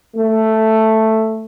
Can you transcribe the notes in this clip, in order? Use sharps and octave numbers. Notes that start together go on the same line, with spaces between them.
A3